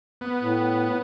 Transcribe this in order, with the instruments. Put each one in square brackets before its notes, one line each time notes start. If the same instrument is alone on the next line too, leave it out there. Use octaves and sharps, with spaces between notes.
[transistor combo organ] B3
[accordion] A2